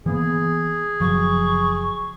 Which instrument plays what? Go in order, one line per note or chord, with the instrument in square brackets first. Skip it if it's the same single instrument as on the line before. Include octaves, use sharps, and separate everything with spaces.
[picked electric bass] E3 A#3 B3 [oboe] G#4
[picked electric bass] F#1 F3 F#3 [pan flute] C#6